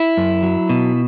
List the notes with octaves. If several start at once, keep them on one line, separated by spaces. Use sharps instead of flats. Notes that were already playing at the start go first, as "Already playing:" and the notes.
Already playing: E4
F#2
F#3
B2